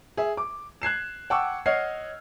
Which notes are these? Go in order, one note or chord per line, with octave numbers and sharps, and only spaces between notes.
G#4 E5
D6
F#6 G#6 C7 E7
F#5 G5 A5 C#6 D6 E6
C#5 D#5 F#5 F6 G#6 C7